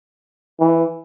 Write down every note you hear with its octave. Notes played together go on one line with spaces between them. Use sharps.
E3